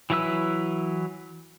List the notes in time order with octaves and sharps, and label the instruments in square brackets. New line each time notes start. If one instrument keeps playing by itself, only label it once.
[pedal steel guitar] E3 F#3 E4 B4 E6